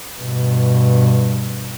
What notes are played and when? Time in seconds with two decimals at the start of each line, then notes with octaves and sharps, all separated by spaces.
0.20 G2 B2